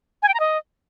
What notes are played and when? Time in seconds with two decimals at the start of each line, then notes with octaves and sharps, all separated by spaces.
0.22 G#5
0.28 G5
0.34 A#5
0.40 D#5